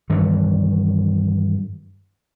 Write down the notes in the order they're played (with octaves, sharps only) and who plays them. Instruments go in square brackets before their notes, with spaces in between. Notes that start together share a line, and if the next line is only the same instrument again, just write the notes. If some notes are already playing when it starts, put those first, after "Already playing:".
[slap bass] G2 D#3 E3 F#3